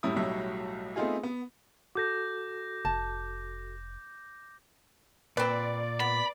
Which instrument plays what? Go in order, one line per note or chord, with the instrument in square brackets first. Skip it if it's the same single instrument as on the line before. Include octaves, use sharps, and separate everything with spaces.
[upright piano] F#2 A2 G3 E4 D#6
B1 A2 F#3 G3 E5
A3 B3 C4 D#4 F4 G#4
B3
[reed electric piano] F#4 A4 [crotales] D6 G6 A#6
[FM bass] F1 [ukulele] A5
[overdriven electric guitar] A#2 [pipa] C4 B4 [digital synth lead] D5
[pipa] B3 [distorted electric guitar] B5